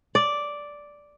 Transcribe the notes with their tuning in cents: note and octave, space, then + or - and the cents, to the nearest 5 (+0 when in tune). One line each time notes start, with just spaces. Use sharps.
D5 -5